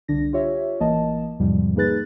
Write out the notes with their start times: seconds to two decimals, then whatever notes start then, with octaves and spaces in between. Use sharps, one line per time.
0.08 C2 D3 D4 A#6
0.33 F4 G4 C#5 E5
0.80 A1 E3 A#3 D#5 A5
1.40 E2 G#2 C3 F3 G3
1.76 A#3 D#4 G#4 B4 F#6 A6